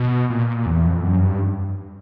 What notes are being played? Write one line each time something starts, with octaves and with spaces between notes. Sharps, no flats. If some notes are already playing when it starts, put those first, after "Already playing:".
Already playing: B2
A#2
E2
F2
F#2
G2